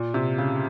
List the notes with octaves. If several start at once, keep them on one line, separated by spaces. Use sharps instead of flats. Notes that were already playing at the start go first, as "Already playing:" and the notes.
Already playing: A#2
C3
C#3